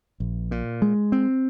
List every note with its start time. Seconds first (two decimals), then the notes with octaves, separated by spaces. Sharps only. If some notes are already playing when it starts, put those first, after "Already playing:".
0.20 A#1
0.51 A#2
0.82 G#3
1.12 C4